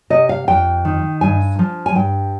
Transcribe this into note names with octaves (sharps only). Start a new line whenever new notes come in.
C3 D#5
F5
F2 G5
D#3
G2 G#5
F3
G#5
G2 G5